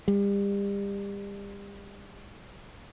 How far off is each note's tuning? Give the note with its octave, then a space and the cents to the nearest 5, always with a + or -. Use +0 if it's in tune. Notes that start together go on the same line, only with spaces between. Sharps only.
G3 +35